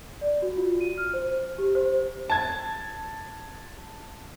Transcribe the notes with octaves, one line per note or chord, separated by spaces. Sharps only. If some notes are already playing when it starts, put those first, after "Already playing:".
D5
F#4
F4
D#7
F6
C5
G4
C5
A5 G#6